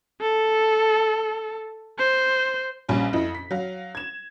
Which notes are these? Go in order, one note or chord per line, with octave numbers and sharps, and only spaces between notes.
A4
C5
A#1 G3 C#4 G#5
F2 E4 D#5
B6
F#3 F5
G#6 E7